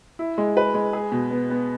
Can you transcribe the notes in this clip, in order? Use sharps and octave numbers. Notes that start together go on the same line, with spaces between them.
E4
G#3
B4
G#3
G#4
B2
B3
B3